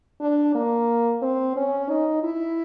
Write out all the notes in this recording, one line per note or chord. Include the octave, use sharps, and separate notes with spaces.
D4
A#3
C4
C#4
D#4
E4